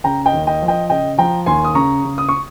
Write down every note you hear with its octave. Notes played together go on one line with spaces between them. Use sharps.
C#3 G5 A#5
D#5 G5
D#2
D#5 G5
F3
D#5 G5
C#3 D#5 G5
F3 G5 A#5
D#2 G#5 C6
D#6
C#3 A#5 C#6
C#3
D#6
C#6